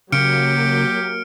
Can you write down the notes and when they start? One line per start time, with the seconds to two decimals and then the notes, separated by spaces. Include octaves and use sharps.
0.12 C#3 F#3 A#3 G4 F6 C#7 D7